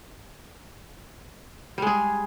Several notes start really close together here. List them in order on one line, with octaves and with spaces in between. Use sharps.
G3 G#3 G#4